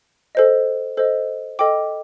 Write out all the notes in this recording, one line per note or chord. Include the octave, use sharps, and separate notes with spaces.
A4 C5 D#5
A4 C5 D#5
A4 D#5 G5 D6